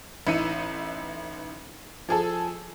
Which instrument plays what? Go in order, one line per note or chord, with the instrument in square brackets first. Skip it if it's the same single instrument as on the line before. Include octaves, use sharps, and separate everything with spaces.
[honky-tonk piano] A1 E3 D#4 E5 C#7 D#7
F3 G#4 A4